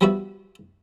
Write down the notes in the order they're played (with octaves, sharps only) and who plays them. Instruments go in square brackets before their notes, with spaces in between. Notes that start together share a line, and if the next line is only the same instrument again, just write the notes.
[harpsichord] F3 G3 B3 F#4 E5